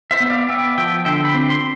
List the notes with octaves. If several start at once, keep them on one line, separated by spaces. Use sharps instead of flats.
C5 E5
B3
D5 F5
B3 E5 G5
F3 E5 G5
D3 E5 G5
G5 B5
C4
C6